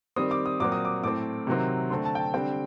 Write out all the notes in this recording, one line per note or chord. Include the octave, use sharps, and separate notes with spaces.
D#3 G3 C4 D#6
D6
D#6
A#2 F#3 C4 D6
D#6
D6
A2 A3 C4 D6
C3 D#3 F#3 C4
D3 A3 C4 C6
A5
G5
A5
D3 G3 C4 G5